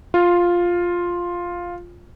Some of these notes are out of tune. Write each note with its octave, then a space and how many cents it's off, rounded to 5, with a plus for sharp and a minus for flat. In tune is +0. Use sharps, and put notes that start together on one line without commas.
F4 +5